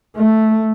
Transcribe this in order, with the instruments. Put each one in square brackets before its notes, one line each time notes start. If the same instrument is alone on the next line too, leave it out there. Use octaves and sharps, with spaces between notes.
[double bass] A3